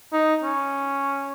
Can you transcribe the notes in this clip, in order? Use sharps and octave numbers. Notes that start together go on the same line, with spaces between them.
D#4
C#4